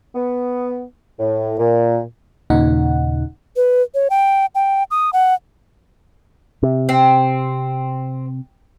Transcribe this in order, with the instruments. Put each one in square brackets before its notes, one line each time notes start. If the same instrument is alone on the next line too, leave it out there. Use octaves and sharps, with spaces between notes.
[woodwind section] B3
A2
A#2
[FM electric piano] D#2 A#2 C#3 D#4 F#5
[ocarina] B4
C#5
G5
G5
D#6
F#5
[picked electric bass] C3
[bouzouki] C4